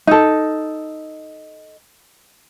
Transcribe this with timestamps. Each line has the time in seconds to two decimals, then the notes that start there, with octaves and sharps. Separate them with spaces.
0.07 D#4 A4